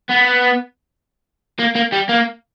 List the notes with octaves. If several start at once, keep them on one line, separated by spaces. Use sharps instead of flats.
B3
A#3
A#3
G3
A#3